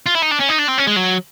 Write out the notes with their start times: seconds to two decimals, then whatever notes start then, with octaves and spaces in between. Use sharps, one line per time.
0.06 F4
0.15 E4
0.22 D#4
0.31 D4
0.39 C#4
0.49 D#4
0.58 D4
0.68 C4
0.78 C#4
0.87 G#3
0.96 F#3